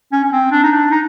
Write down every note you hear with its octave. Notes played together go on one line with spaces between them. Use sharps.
C#4
C#4
C4
D4
D#4
D4
D#4